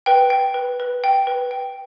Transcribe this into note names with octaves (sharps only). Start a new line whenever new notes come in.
B4 G5
G5
B4
B4
G5
B4
G5